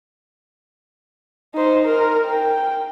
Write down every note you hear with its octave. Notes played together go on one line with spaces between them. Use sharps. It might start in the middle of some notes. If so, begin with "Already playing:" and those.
D#4 C5
A#4
G5